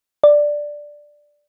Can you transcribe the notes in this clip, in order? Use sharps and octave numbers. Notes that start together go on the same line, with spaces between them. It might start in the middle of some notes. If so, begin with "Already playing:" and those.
D5